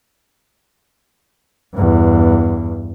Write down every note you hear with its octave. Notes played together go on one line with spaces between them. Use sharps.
E2 G2